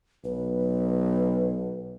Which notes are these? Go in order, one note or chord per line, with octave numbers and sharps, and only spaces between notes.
B1 B4